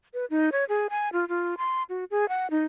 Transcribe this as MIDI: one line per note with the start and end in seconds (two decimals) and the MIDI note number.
0.14 0.25 71
0.30 0.50 63
0.52 0.65 73
0.69 0.87 68
0.90 1.09 80
1.13 1.28 65
1.29 1.55 65
1.58 1.83 84
1.89 2.04 66
2.11 2.28 68
2.29 2.50 78
2.51 2.64 63